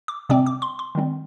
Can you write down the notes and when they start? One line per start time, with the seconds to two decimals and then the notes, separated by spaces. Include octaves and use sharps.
0.08 D6
0.29 C3 G3 C4 D6
0.46 D6
0.62 C6
0.79 C6
0.95 D#3 G3 C4